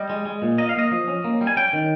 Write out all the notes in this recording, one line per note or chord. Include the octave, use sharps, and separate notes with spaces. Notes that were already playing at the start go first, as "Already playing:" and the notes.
Already playing: G3 D#5
G#3
G#3
A#2
A#3 D#5
F5
A#3 D#5
F3
C#4
A#3
G3
G#5
C#4 G5
D#3